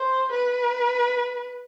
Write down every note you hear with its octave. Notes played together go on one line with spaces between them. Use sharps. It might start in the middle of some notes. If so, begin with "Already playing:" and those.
Already playing: C5
B4